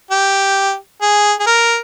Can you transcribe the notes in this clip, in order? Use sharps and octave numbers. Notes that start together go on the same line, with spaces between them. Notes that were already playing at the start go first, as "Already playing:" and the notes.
G4
G#4
G#4
A#4